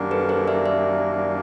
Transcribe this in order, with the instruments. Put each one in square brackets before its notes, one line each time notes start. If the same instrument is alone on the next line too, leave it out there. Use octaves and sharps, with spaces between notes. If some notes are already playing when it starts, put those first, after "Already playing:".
Already playing: [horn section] F#2 D#3 G3 A#3 D4
[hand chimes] A4 B4
A#4 C5
D5 E5
D5 E5